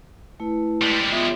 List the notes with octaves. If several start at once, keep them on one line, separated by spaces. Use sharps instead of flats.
A3 E4 B4
G3 G#3
B3 F4 E5